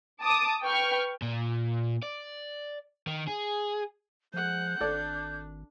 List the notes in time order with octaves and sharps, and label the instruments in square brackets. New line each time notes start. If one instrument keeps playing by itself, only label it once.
[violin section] A5 D6 D#6
B4 G5 C#6 F6
[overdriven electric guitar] A#2
D5
D#3
G#4
[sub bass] F3 [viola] G#3 F#5 [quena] G6
[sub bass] G#1 [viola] D4 [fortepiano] A4 D5